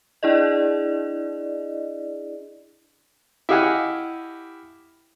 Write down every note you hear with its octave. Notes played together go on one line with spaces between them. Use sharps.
D4 E4 G#4 D5 D#5
E4 G4 D#5 F5 F#5 G#5